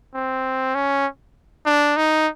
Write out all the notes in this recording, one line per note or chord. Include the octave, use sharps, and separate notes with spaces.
C4
C#4
D4
D#4